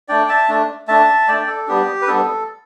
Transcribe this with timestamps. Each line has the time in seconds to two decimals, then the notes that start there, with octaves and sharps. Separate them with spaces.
0.08 A3 D4 D5 G5
0.29 E5 A5
0.49 A3 D4
0.88 A3 D4 E5 A5
1.28 A3 D4 D5 G5
1.47 A4
1.67 G3 B3 D4 G4
2.02 B4
2.07 G3 B3 D4 A4